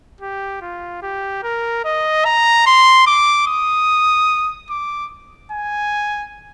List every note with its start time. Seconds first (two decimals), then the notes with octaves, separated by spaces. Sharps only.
0.21 G4
0.61 F4
1.02 G4
1.43 A#4
1.85 D#5
2.25 A#5
2.66 C6
3.07 D6
3.48 D#6
4.70 D6
5.52 G#5